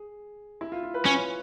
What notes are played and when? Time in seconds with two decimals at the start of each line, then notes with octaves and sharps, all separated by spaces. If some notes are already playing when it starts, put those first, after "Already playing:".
Already playing: G#4
0.61 E4
0.72 F4
0.83 F4
0.94 B4
1.05 C#4 C#5